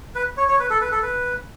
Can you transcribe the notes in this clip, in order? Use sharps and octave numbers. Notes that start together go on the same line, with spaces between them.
B4
C#5
C#5
B4
A4
B4
A4
B4